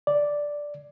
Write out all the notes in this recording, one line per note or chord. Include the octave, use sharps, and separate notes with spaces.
D5